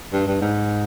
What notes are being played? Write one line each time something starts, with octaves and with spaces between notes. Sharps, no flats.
G2
G2
G#2